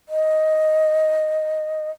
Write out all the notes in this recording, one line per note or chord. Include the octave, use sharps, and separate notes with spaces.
D#5